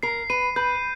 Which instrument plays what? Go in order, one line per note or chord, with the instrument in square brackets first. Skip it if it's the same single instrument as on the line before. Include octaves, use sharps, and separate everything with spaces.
[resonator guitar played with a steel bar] A#4 [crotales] C7
[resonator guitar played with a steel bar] B4 [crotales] D#7
[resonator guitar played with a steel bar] B4 [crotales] G6